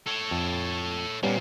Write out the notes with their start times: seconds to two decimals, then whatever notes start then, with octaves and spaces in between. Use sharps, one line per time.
0.06 A4 C#5
0.31 F2
1.23 A#2 G3 A#3 B3 C#4